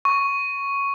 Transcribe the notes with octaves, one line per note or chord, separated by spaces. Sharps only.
C#6